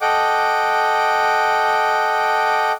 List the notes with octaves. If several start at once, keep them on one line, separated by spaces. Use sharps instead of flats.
A4 D#5 F#5 G5 D6